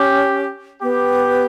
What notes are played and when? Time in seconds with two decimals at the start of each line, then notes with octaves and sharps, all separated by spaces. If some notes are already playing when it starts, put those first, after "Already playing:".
Already playing: C#4 G4
0.82 B3 G4